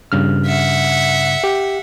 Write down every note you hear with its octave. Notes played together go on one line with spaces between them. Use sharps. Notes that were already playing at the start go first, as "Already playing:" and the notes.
G2 C#3 F6
E5 F#5
G4